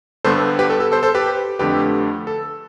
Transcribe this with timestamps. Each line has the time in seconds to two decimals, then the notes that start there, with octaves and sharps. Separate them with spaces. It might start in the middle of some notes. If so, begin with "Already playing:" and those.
0.24 G2 D3 G3 B3 A4 C5
0.59 G4 B4
0.70 A4
0.80 A4
0.92 A4 C5
1.03 A4 C5
1.15 G4 B4
1.59 F2 D3 A3 G4 B4
2.27 A4